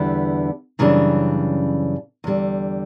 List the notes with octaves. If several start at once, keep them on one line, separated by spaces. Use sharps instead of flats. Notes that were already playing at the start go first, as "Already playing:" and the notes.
Already playing: E2 D3 G3 B3 E4
F#2 C#3 E3 G3 D4
E2 D3 G3